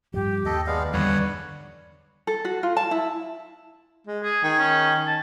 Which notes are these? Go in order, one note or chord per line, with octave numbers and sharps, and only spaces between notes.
G2 F3 G4
D#2 A4 D#5
G#3 B3 D5 F5
E2 G2 D3 D#3 B4 C#5 F#5
A4
F#4
F4
A5
E4
G#3
G#4
D#3 G#4
C#4
A5